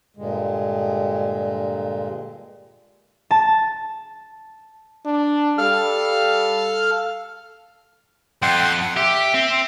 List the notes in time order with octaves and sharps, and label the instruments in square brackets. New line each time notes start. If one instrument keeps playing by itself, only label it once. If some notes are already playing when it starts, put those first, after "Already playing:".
[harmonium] G2 A#2 D3 G#3
[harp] A5
[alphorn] D4
[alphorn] G3 [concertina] A4 F5 F6
[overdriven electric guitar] F2 [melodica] F#5 G5 C6
[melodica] F#5
[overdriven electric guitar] G4 [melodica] E5
[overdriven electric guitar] C4